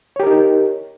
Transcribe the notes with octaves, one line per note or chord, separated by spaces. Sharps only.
D#4 G4 A#4 C#5